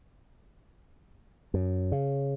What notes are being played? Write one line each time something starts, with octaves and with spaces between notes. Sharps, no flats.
F#2
C#3